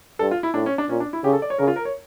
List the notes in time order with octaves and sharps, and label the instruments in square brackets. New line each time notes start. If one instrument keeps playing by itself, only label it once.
[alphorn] G2 [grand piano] A4
[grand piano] F4
E4
[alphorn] A2 [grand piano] D4
[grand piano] C#4
D4
[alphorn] A#2 [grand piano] C#4
[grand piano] D4
E4
[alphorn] C#3 [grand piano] G4
[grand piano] A4
D5
C#5
[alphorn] C#3 [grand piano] A#4
[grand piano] F4
A#4
C#5